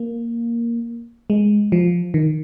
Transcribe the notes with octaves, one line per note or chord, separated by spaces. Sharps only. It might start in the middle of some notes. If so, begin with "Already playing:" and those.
Already playing: A#3
G#3
F3
D#3